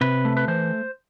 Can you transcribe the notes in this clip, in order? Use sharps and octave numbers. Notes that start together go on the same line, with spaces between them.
C3 B4
A3
B4
E3 C5